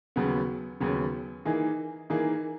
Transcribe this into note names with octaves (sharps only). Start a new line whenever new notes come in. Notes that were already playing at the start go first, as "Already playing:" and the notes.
D#2 C#3 F#3 B3
D#2 C#3 F#3 B3
E3 A#3 D#4 G#4
E3 A#3 D#4 G#4